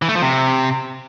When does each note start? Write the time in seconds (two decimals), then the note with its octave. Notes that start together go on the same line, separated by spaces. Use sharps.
0.02 E3
0.09 A3
0.15 F3
0.22 C3